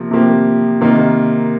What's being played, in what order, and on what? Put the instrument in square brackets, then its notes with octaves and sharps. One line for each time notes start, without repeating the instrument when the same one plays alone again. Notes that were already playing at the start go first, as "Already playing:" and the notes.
Already playing: [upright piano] C3 F3 A#3
C3 F3 A#3 G4
C3 D#3 A#3 D#4